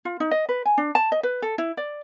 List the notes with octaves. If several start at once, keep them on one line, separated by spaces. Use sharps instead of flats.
F4
D#4
D#5
B4
G#5
D4
A5
D#5
B4
A4
E4
D5